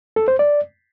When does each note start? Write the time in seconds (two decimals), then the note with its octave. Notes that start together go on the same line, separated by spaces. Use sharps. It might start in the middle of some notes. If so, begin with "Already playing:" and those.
0.16 A4
0.28 C5
0.39 D5